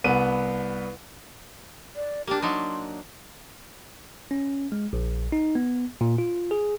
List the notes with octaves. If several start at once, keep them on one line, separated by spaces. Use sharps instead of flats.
C2 B3 D#7
D5
A#3 D4 G4
F#3 D4 D#4 C6
C#4
G#3
A#1
D#4
B3
A#2
F4
G#4